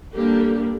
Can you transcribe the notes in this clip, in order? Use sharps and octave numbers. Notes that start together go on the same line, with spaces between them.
D3 G3 A#3 D4 G4